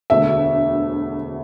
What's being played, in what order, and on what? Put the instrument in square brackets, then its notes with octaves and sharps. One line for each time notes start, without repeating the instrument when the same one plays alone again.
[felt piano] E1 D2 D3 E5